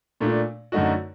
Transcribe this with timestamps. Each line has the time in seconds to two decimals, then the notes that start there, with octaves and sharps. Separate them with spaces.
0.21 A#2 A3 D4
0.72 F#2 D3 A3 D#4 F#4